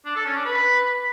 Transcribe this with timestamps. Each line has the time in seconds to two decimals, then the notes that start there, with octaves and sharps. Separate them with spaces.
0.06 D4
0.16 A4
0.25 C#4
0.35 D4
0.45 B4